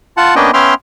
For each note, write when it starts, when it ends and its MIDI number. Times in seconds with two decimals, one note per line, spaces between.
0.17 0.35 65
0.17 0.35 78
0.17 0.35 81
0.36 0.51 58
0.36 0.51 59
0.36 0.51 61
0.36 0.51 62
0.36 0.51 75
0.36 0.51 79
0.54 0.74 59
0.54 0.74 61
0.54 0.74 76
0.54 0.74 79
0.54 0.74 84
0.54 0.74 89